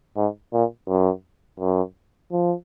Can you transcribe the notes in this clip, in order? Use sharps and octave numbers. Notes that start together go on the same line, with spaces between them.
G#2
A#2
F#2
F#2
F3